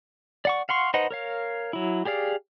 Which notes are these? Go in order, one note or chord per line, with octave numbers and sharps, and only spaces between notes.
D5 F#5 C#6
F5 F#5 C6 C#6
D#4 B4 C5 D#5 F#5
A#4 C#5 F5
F#3 E4
G4 G#4 D5 F5